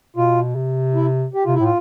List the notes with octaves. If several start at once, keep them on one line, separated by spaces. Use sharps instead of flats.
B2 F4
C3
E4
G4
C3 F4
E4
A2 F4